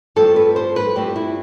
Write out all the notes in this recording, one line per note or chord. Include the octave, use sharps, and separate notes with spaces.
G2 F3 A3 C4 A4
B4
C5
B4
G2 F3 A3 C4 G4
E4